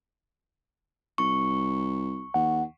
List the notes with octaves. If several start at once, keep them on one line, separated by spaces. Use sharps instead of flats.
C2 C#6
D#2 F#5